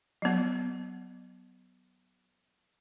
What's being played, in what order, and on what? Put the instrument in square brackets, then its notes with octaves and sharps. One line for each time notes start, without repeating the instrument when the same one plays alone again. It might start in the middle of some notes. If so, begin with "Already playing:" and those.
[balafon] F#3 B3